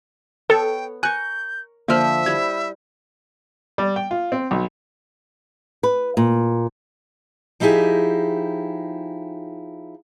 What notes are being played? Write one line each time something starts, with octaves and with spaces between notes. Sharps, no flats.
B3 A4 C#5 G5
A#4 G#5 A#5 C#6 F#6 G6
D3 F3 A#3 F4 C5 E5 F6
G3 E4 G#6
G3
G5
F4
C4
B1
B4
A#2
F3 D#4 E4 G4 G#4